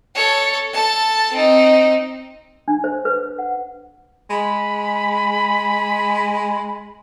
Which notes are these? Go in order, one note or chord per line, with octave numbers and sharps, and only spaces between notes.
A4 C#5
A4 A5
C4 D#4
D4
C5
B4
F#5
G#3 B5